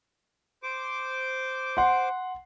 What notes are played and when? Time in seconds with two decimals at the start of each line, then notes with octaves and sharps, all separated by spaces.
0.63 C5 D6
1.77 F#5 C6